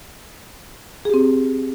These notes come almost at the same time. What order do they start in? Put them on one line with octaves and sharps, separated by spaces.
G#4 G4 C4